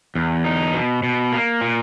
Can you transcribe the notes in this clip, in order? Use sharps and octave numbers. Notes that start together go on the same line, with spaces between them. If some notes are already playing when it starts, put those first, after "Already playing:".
E2
D#4
B2
B2
A#3
A#2